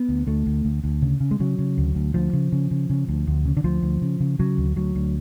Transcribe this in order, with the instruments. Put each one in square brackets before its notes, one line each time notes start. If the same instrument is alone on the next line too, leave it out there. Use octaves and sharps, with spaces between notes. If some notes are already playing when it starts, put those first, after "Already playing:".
Already playing: [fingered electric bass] B3
D2
D2 A3
D2
D2
D2
C#3
C#3
G#3
C#3 F#3
C#3
D2
D2
D2 F3
C#3
C#3
C#3
C#3
D2
D2
C#3
D3
D2 F3
D2
C#3
C#3
C#3 F#3
D2
D2 F#3
D2